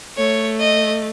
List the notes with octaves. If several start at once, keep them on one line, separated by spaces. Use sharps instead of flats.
A3 C#5
D#5